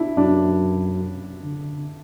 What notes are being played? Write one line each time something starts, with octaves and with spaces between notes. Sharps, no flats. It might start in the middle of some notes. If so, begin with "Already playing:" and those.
Already playing: D4 E4
F#2 D4
D3